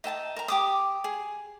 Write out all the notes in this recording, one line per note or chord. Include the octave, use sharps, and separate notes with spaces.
D#4 E5 G5 A5
A#4 A#5
G4 D6 D#6
G#4